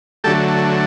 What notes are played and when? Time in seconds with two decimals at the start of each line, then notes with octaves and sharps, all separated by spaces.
0.24 D3 F#3 A3 G4 A4